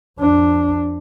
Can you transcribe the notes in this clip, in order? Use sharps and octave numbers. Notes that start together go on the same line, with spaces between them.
F2 D4